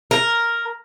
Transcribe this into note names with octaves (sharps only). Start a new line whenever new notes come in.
A#4